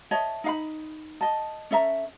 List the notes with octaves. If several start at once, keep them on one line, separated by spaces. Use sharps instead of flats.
C#5 D#5 E5 A5
D#4 F5 B5
D#5 A5
C#4 A4 E5 A#5